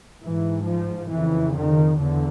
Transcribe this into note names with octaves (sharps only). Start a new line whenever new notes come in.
G#2 E3
F3
F2 C#3 E3
D#3
E2 D3